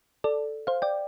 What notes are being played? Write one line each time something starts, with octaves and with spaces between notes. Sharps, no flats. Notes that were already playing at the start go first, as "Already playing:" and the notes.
A4 D5
C5 F5
D5 G5